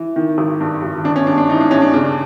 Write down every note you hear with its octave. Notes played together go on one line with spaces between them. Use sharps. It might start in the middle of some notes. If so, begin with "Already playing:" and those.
Already playing: E3
D#3
G#1
G2
G#1
G1 D4
C#4
G2 D4
D4
E3 D#4
D4
G2 C#4
D4
C#3 D4